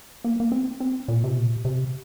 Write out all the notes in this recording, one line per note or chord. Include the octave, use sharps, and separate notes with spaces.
A#3
A#3
C4
C4
A#2
C3
A#2
C3